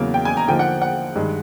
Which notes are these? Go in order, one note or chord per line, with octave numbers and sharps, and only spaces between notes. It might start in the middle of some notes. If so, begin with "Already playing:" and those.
Already playing: E2 C#3 F#3 A#3
G5
G#5
A#5
D3 F3 A#3 D#4 G5
F#5
F#5
G2 D#3 G#3